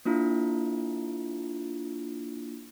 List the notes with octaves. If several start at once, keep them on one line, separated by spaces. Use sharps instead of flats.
A#3 D4 E4 F4